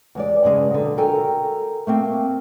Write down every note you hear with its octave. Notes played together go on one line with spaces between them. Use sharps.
E2 G#3 D5
G2 C#3 G#3
D3 F#3
F#4 A4 A#4 G5 G#5
A3 A#3 C4